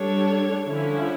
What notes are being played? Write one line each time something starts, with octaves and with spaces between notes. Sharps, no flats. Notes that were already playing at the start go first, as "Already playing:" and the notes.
Already playing: G3 D4 A4 C#5
D3 F3 C#4 E4